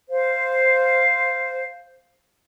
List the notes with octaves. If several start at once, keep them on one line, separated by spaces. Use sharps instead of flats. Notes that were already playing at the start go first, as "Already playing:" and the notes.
C5 F5